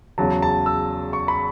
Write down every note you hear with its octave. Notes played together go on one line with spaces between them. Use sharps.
E2 C#3 F#3 C#4 A5
A5
E6
C#6
B5